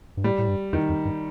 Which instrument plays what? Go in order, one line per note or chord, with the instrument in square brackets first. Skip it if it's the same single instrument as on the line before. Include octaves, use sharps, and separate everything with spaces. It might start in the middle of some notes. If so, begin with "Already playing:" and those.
[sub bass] G2
[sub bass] A2 [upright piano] G3
[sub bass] A2
G2
[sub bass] F2 [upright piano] D#3
[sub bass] F2
G2